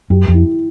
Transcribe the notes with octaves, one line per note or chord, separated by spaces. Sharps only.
F#2 G4
F2
E4